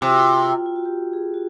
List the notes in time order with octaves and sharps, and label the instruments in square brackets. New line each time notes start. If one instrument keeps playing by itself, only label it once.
[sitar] C3 [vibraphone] F4
[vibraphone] F#4
F4
F4
F4
F#4
G4
G#4
F#4